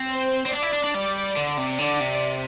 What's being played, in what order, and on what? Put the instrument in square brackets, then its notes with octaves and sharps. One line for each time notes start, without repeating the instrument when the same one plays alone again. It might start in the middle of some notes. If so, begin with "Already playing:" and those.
Already playing: [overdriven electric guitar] C4
[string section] C5
[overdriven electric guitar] C4
[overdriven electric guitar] D4 [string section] D5
[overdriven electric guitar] E4
D4
D4
G3
D3
C3
[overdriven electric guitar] D3 [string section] D5
[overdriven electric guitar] C3